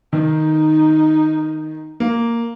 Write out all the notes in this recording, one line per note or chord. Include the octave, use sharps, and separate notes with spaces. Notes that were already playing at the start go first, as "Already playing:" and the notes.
D#3 D#4
A#3